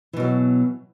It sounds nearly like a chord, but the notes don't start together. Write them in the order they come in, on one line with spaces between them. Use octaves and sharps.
E3 B2 F#3